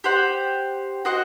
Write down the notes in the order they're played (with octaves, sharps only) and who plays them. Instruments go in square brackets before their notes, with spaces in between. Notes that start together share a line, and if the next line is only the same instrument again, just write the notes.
[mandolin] G4 C5 F#5
F#4 C5 D#5 F#5